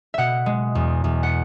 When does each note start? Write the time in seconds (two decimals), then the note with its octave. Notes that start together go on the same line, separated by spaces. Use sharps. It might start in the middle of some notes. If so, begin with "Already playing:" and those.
0.14 B2 E5 F#5
0.46 G#3
0.75 E2
1.04 E2
1.23 F#5